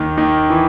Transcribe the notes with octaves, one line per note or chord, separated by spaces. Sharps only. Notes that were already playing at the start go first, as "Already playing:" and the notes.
Already playing: D#2 D#3
D#2 D#3
E3